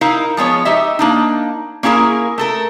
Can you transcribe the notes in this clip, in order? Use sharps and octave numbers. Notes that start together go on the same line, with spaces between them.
D#4 E4 A#4 F5
F3 G#3 B3 C#5
D#4 G4 D#5 E5
A#3 D4 D#4
A#3 C#4 E4 G#4 A#4
A3 A4 A#4